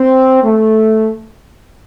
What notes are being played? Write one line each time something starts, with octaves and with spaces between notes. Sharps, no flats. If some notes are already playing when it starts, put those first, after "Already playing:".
Already playing: C4
A3